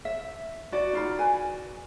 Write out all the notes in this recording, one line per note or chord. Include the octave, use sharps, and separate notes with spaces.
E5
F#4 D5
D#4 F4 B5
B4 G#5